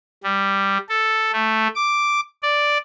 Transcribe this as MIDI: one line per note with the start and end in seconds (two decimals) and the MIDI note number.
0.24 0.78 55
0.89 1.31 69
1.33 1.68 57
1.75 2.20 86
2.43 2.78 74